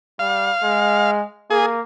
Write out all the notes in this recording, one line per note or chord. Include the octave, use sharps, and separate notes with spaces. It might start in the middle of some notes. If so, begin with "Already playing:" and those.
G3 F5
G#3
A#3 G#4